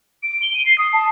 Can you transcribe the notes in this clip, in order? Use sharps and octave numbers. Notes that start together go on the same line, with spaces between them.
D7
G7
D#7
C7
D#6
A5